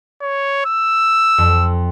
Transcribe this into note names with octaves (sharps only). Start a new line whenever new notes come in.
C#5
E6
F2